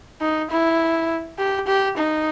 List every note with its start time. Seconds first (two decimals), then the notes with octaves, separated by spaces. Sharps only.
0.21 D#4
0.51 E4
1.39 G4
1.67 G4
1.98 D#4